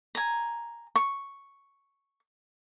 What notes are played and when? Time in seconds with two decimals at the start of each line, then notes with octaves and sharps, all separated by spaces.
0.15 G#5 A#5
0.96 C#6